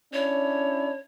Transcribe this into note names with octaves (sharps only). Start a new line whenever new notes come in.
C#4 D4 E4 C#5